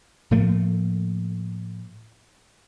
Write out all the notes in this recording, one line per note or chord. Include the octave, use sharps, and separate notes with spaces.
A2 F3 A3 A#3